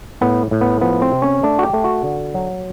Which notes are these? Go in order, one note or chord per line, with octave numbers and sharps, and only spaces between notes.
A2 B3
A2
B3
F3 B3
C4
C3
C#4
A3 D4
F#4
G4
A3
F#4
D3
F#3